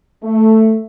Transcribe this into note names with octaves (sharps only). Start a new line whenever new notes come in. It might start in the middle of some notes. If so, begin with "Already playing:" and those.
A3